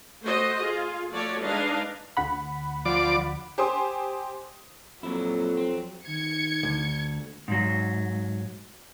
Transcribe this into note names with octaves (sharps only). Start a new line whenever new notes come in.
A3 F#4 C5 D#5
F4 G#4
F3 A3 F#4 A4 C#5 D5
G#3 D4 D#4 B4 D#5 F5
D2 F#5 B5
F3 D5 D6
G4 C5 G5 G#5 C6 D#6
F2 A#2 F#3 E4
C4
D#3 G#6 C#7
D2
G#2 F#3